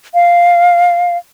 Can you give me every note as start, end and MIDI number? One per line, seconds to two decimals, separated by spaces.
0.14 1.17 77